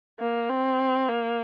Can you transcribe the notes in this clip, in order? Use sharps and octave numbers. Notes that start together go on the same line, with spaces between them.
A#3
C4
A#3